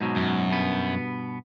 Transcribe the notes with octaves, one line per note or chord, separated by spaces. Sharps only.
G#2 B2 F#3
F#2
G2 B2 B3